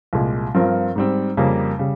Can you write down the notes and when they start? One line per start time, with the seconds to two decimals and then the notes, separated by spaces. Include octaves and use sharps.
0.13 C2 A#2 G#3
0.55 G2 F3 C4 F4 A#4
0.96 G#2 G3 C4
1.37 F2 C#3 G3 A#3
1.79 C#3 G3